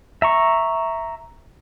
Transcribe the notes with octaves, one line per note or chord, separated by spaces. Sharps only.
E5 A#5 C#6